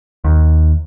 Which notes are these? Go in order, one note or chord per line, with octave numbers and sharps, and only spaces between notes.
D#2